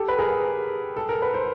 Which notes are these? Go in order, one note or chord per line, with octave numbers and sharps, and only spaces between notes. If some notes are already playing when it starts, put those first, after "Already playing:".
Already playing: G4 A4
B4
G#4 A#4
A4
A#4
B4
C5